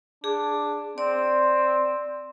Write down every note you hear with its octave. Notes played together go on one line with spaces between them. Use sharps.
D4 G#4
C4 D5